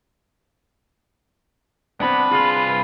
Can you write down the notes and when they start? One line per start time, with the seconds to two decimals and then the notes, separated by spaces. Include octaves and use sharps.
2.00 C2 B3 C4 D4 B4
2.31 F4 G#4 C6